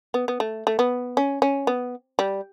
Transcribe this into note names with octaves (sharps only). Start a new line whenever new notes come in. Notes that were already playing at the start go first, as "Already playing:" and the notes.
B3
B3
A3
A3
B3
C#4
C#4
B3
G3